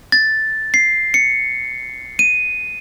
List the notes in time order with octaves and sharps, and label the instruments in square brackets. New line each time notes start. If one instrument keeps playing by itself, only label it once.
[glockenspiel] A6
C7
C#7
D#7